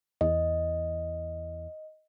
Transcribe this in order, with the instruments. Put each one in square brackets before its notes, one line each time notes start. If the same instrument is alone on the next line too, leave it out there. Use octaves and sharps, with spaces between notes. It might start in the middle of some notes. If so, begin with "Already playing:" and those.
[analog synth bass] E2 [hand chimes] D#5